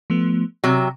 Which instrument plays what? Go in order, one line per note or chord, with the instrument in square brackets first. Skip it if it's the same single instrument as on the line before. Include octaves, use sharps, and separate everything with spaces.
[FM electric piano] F3 A3 B3
[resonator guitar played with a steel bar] C3 F#3 [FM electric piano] G5